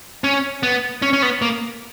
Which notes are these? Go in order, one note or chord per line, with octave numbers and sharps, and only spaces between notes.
C#4
B3
C#4
C#4
B3
A#3